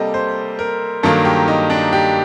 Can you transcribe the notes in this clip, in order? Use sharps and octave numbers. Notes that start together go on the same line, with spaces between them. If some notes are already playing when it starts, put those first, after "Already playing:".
Already playing: C3 G3 A#3 G4 A4 D#5
C5
A#4
G2 D#3 F#3 A#3 A4
G4
D#4
D4
G4